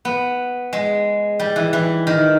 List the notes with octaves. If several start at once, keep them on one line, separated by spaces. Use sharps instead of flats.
B3
G#3
G3
E3
E3
D#3